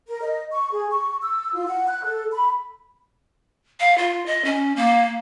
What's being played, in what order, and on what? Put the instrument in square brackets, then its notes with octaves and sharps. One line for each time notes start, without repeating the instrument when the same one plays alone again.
[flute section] A#4
D#5
C#6
G#4
C#6
E6
F4
F#5
F#6
A4
B5
[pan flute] F5
F4
D#5
C#4
A#3